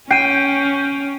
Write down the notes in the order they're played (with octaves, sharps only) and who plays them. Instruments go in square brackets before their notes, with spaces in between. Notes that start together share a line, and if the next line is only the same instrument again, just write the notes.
[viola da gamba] C#4 [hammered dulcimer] G5 [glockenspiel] C7 D#7